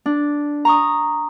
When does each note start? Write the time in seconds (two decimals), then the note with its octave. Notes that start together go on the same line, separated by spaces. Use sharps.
0.06 D4
0.65 A#5 C#6 D#6